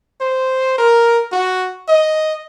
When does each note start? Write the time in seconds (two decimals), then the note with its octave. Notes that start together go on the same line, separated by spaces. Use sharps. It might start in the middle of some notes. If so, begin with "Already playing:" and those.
0.21 C5
0.78 A#4
1.32 F#4
1.88 D#5